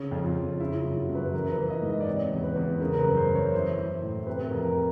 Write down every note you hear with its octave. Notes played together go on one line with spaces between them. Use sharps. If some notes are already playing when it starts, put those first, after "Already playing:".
Already playing: C#3 C#4
F2
F4
F2
C#3 E4
E4
F4
F#2
F#4
F#2
B4
E3 A#4
B4
E3
D#5
G#2
D#5
D5
C3 C#5
E2
B4
E2
C#3 A#4
A#4
B4
F#2
C5
F#2
C#5
E3 C5
E3
A2
C3 B4
F2 A#4
A#4